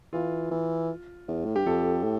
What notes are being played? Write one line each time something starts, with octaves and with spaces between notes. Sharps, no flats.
E3 F4
E3
E2
A2
G2 G4
F2 A4
A2